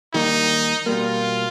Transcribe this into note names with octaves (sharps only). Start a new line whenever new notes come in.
D#2 D#3 G3 A#3 D#4
B2 G3 A#3 F4